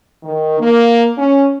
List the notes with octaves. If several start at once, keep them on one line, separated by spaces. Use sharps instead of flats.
D#3
A#3
C#4